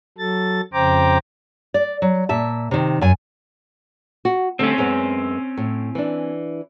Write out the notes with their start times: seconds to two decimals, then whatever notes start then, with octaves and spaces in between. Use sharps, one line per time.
0.18 F#3 A4 A6
0.73 F2 C#3 C5 G5 A#5 D6
1.74 D5
2.02 F#3
2.29 A#2 E5 A5
2.71 C3 D#3
3.01 F#2 G#5
4.25 F#4
4.59 D3 G3 A3 C4 C#4
4.78 F#2 G#3 B3
5.57 A2
5.95 E3 D4